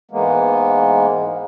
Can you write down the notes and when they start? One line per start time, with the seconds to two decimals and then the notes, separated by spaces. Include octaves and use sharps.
0.11 G#2 E3 G#3 A#3 B3